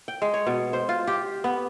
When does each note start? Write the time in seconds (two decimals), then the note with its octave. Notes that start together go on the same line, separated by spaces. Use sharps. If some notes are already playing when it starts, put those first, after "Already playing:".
0.08 G5
0.22 G#3
0.34 C#5
0.47 B2
0.73 C5
0.89 F4
1.07 G4
1.44 B3